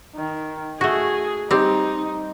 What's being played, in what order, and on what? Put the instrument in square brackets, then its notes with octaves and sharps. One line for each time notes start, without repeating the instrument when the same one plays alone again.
[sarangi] D#3
[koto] A3 F#4 [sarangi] G#4
[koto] G3 C4 [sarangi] D#4